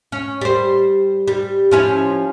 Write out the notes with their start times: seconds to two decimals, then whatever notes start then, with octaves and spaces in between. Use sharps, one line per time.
0.12 C#4
0.41 G3 C5
1.28 G3
1.71 F3 C#4 E4